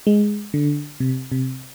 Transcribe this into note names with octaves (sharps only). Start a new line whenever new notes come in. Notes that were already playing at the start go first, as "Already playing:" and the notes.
G#3
D3
C3
C3